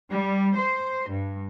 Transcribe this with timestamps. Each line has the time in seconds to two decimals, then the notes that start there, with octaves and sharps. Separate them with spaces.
0.10 G3
0.57 C5
1.09 G2